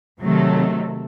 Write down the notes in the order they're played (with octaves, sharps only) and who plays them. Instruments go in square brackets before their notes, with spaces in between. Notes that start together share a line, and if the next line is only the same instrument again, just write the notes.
[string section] C3 D#3 F#3 A3